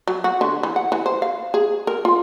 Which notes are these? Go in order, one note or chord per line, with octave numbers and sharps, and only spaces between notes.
F#3
F#4
D3
E3
F#5
E3
C5
F5
G#4
A#4
F4